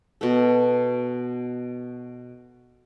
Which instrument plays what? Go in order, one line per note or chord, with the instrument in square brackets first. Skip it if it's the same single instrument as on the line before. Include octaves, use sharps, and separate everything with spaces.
[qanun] B2 F#4 A4